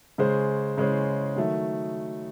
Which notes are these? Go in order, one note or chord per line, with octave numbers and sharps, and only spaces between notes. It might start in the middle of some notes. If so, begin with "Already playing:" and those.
C#3 G#3 C#4 G#4 C5
C#3 G#3 C#4 G#4 C5
D#3 F#3 A3